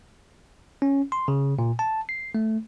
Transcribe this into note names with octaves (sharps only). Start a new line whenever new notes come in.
C#4
C6
C#3
A#2
A5
C7
A3